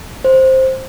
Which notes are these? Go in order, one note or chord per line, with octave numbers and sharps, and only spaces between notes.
C5